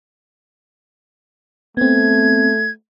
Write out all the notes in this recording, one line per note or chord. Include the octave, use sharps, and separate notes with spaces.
A3 B3 C4 G#6